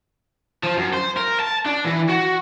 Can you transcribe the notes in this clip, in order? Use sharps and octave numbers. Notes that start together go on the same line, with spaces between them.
F3
F#2
C5
A#4
A5
D4
E3
F#4